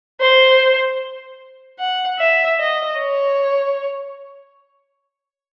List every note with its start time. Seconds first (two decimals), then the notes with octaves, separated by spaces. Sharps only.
0.20 C5
1.79 F#5
2.19 E5
2.59 D#5
2.99 C#5